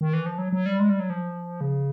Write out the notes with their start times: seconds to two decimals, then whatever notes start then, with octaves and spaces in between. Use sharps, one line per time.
0.01 D#3
0.13 E3
0.26 F3
0.38 F#3
0.53 F#3
0.66 G3
0.80 G#3
0.90 G3
1.00 F#3
1.10 F3
1.61 C#3